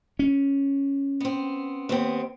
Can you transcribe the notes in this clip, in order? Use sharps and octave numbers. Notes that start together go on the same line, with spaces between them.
C#4
B3 C4
D#2 B3 C4